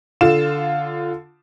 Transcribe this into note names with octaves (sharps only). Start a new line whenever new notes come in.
D3 F4 E7